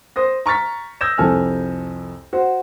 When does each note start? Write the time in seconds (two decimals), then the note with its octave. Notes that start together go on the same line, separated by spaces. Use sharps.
0.16 C5 D#6 A#6
0.46 A#5 C#6 F6 A6 B6
1.01 D#6 E6 G6 G#6 A#6 E7
1.18 C2 F2 A4 G#5 F6
2.33 F#4 C5